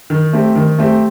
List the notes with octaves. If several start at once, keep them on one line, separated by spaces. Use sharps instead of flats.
D#3
A3 C4 G4
D#3
A3 C4 G4